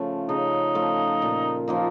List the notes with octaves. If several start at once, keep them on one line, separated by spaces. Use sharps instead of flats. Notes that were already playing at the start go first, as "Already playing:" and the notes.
Already playing: C#3 F3 A3
C#3 D#4
F3 A3
A#2
F3 A#3 D#4